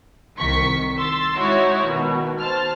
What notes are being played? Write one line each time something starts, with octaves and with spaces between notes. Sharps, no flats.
C2 D#3 C#6 B6 C#7
C6 E6 A6
G#3 D#4 E4 F#4 C#5
B2 D#3
C5 A5 F6